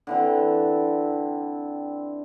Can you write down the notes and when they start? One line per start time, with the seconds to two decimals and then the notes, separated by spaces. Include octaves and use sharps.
0.07 D3 E3 C4